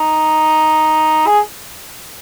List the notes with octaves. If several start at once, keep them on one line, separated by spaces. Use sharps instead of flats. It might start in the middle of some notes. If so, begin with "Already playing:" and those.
Already playing: D#4
G#4